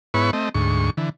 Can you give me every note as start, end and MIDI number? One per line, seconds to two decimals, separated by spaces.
0.14 0.31 44
0.14 0.31 59
0.14 0.31 64
0.14 0.31 71
0.14 0.31 73
0.14 0.31 85
0.33 0.49 57
0.33 0.49 60
0.33 0.49 75
0.54 0.90 38
0.54 0.90 44
0.54 0.90 85
0.97 1.09 50
0.97 1.09 52